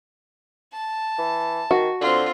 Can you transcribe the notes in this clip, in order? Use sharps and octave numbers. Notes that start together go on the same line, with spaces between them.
A5
E3
D#3 F#4
D3 C4 F4